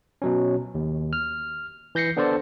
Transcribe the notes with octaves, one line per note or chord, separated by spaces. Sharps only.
B2 F#3 C#4
D#2
F6
E3 G6 A#6 C7 C#7
B3 D4 A4 C5 D5